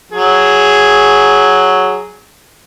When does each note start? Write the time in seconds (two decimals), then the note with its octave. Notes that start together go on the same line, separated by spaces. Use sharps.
0.12 F#3 G#4